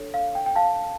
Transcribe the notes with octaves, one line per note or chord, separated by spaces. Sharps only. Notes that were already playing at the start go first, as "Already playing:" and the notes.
Already playing: D4 A4 C#5
F5
G5
G5
F5 A5